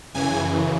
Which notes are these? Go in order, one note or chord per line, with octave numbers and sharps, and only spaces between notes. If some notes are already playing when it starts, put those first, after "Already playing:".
F#2 C#3 E3 G#5